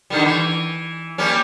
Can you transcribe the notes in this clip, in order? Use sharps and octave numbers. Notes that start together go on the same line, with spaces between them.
D3 D#3 G3
E3
G3 A#3 C#4